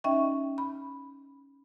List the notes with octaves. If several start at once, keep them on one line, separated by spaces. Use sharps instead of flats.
C#4 D#4 D#5 E5 G5 C#6
B5